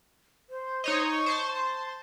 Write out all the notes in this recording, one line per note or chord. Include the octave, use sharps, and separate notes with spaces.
C5
D#4 C#5 D#5
C#6
C5 A5
C6